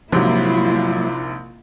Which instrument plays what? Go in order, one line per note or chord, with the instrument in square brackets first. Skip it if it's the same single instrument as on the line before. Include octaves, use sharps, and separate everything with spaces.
[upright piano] A#1 G#2 C3 [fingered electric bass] F3 F#3 [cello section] A#3 E4 F4